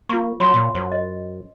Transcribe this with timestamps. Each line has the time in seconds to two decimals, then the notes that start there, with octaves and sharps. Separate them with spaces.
0.09 A#3 F4 C#6
0.40 F#3 C#5 B5 C6
0.54 A#2
0.75 F#2 C5
0.92 D#5